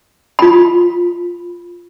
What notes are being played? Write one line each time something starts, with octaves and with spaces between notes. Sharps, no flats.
F4 B5